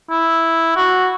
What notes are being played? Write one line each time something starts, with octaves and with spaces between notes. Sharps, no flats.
E4
F#4